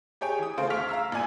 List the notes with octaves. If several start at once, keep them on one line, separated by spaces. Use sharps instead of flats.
G4 G#4 C#5 G5 G#5
E3 D#6
C#3 A3 F4 G#4 C5 D7
D2 F5 C#6 F6 B6 F7
F5 A#5 E6
G#1 A#2 D5 G#5 G#6 D#7